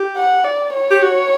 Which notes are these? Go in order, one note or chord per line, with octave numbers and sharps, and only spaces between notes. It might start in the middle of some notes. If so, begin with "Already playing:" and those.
Already playing: G4
F#5
D5
C#5
G4
F#4